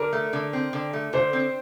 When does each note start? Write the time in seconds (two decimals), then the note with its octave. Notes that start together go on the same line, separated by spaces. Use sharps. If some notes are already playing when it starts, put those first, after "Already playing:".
Already playing: D3 A#4
0.13 A3
0.33 D3
0.53 C4
0.73 D3
0.93 A3
1.13 D3 C5
1.33 C4